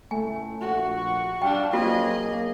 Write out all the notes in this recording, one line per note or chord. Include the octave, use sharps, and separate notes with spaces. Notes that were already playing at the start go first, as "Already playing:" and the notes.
C#2 A2 A3 G#5
A#1 F#4 F#5
C#6
G3 D4 F5 G5
F#3 A#3 C4 C#4 F4 F#4 G#4 D#5
B1